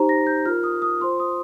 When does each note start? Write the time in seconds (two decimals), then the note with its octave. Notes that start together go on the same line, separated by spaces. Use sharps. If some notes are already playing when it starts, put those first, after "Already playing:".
Already playing: D#4 G4 C5 A#5
0.09 A#6
0.27 G6
0.46 F4 A#4 F6
0.64 D#6
0.82 D#6
1.00 F4 C5 C6
1.20 D#6